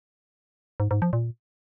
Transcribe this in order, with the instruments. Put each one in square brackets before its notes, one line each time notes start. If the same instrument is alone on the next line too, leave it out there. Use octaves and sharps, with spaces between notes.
[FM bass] G#2
G#2
F3
A#2